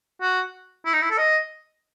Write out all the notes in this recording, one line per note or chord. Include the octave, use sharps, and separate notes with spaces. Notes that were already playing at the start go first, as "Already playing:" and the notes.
F#4
E4
D#4
E4
A4
D#5